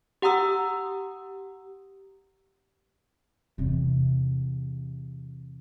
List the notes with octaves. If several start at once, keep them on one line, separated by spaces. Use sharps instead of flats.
G4 F#5 A#5 D#6 E6
E2 C3